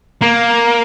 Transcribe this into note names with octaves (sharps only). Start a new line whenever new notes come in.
A#3